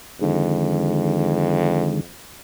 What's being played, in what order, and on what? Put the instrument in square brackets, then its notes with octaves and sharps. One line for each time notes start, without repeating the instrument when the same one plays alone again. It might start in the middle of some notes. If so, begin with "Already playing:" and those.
[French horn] F2 [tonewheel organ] D3 D#3 G#3